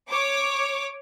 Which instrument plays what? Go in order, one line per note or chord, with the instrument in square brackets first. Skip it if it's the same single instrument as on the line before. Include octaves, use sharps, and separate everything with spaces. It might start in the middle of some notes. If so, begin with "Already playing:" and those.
[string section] C#5 D6